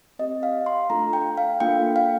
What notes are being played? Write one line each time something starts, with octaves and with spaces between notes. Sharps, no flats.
C4 G4 D#5
F5
C6
A3 D4 F4 A4 A#5
G5
F5
A#3 D4 F4 A4 G5
F5